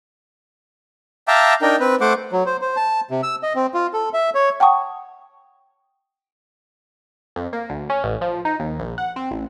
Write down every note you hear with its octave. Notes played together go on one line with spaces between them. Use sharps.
E5 F5 G5 A5 A#5 D6
D4 D#4 A#4 G5
C4 B4
A3 C5 F#5 D6
F#3
C5
C5
A5
C3
E6
D#5
C4
F4
A4
E5
C#5
F#5 G5 A5 C#6 D#6
F2
A#3
D2
C#4
A1
F3
D#4
D#2
A#1
F#5
C4
A1